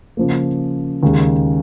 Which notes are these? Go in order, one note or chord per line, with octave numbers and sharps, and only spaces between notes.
C#3 F3 A#3
D#2 C#3 G#3